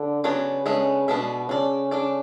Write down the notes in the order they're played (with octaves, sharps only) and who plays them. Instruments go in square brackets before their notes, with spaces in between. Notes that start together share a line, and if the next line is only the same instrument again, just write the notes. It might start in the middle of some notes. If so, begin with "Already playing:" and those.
Already playing: [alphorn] D3
[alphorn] C#3 [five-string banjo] F#3 B3 D4 A4 C#5
[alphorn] C#3 [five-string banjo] G#3 B3 D4 A4 E5
[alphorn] B2 [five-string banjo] G#3 B3 D4 A4 E5
[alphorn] C#3 [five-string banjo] D4 A4 D5
[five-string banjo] D4 A4 D5